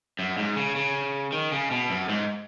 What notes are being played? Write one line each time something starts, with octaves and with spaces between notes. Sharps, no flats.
F#2
G#2
C#3
C#3
D#3
C#3
B2
F#2
G#2